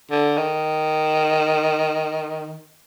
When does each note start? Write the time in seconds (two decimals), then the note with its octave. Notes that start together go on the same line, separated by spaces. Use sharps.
0.11 D3
0.38 D#3